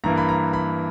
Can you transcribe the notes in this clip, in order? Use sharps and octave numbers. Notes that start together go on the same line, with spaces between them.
G2 E3 A#3 A#5
B5
A#5
B5